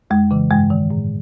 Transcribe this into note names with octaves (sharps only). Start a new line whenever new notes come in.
F2 G#3
C#3 E3
G2 G#3
D#3
A2